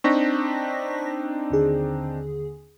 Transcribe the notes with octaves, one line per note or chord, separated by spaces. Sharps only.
C4 D4 D#4 C#6 A#6 B6
D#2 D3 G#4